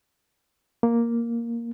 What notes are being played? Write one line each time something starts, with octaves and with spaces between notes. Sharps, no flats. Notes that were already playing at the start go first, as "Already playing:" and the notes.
A#3